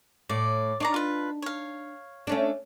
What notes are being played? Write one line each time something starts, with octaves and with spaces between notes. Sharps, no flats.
A2 D5
D4 D#4 C#5 D5 A#5
F4 B4
C#5 F5
A3 C#4 D4